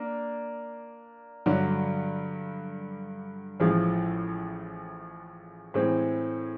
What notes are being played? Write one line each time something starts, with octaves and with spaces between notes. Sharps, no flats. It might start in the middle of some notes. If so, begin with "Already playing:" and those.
Already playing: A#3 D4
G2 D3 F#3
A1 A2 F3 G#3
A2 E3 G#3 C4